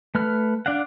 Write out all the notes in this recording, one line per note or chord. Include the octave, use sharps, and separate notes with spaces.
A3 B4 F6
D4 D5 F5 F#5